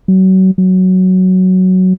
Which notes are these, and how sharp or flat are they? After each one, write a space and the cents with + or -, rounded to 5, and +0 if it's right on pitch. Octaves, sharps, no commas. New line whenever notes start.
F#3 +30
F#3 +5